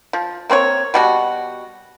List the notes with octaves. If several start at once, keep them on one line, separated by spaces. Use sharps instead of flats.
F3
A#3 C4 B4 C#5
B2 G3 F#4